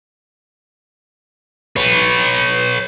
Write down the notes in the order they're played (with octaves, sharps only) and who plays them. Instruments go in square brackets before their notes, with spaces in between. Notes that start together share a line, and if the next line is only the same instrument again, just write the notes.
[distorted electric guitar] B4 C#5